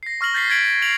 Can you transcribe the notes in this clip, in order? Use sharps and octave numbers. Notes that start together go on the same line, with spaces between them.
A#6 C7
C#6 F6 A#6 F#7 G7
G6 A6 B6 C7 G7
G#6 A6 B6 D7 F#7
C7 D7 F7 F#7